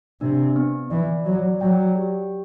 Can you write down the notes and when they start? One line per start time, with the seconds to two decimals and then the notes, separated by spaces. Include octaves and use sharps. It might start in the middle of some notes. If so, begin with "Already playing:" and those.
0.21 C3 D4
0.56 B3
0.90 E3 D5
1.26 F#3 D5
1.61 F#3 G5
1.96 G4